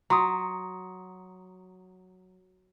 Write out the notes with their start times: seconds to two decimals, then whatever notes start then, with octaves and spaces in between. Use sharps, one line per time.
0.10 F#3 A#5 C6 D#6